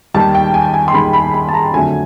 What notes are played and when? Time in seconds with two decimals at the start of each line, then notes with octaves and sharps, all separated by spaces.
0.14 D#2 D#3 G3 A5
0.35 G5
0.54 G#5
0.74 G#5
0.88 C6
0.94 D#2 D#3 G3 B5
1.13 B5
1.34 B5
1.49 A5
1.54 A#5
1.73 F2 D3 F#3 A3 G#5